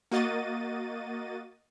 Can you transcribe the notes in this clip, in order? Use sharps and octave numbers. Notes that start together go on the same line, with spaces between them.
A#3 F#4 D#5 A6 D#7